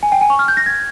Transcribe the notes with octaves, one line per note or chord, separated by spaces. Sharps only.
G#5
G5
G#5
C#6
F6
G6
A#6
G#6